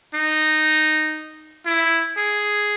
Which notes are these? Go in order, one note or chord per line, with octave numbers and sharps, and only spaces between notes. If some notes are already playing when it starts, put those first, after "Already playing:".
D#4
E4
G#4